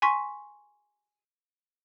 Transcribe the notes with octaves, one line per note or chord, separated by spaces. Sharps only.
G#5 C6 C#6 B6